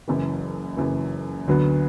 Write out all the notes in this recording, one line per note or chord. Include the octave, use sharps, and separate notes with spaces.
F#1 F#2 E3
F#1 F#2 E3
D2 D3 F#3 B3